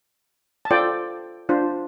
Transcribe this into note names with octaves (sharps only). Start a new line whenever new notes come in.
A5
F4 A4 C5 D5 G5
D4 F4 C5